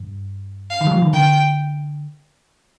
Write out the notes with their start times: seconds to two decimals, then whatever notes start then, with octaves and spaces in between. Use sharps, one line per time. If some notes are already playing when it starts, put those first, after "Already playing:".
Already playing: G2
0.70 F5
0.81 D#3
0.87 G3
0.92 F3
1.02 D#3
1.13 D3 G5